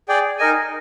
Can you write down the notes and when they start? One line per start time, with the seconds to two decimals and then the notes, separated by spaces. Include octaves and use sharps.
0.08 G#4 D5 G5
0.38 D#4 A#4 D#5 G#5